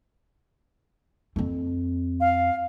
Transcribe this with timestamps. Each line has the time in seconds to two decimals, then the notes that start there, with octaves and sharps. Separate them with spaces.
1.36 F2 C4
2.20 F5